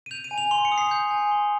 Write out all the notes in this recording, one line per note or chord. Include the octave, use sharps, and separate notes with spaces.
D#7
G6 F7
D#7
G#5
F7
C6 F7
C#7
D#6
C7
G6
G#5
C6